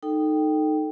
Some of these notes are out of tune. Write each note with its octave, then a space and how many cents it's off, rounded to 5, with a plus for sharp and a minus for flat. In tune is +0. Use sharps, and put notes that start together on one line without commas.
D#4 -10 A4 +0 G5 +0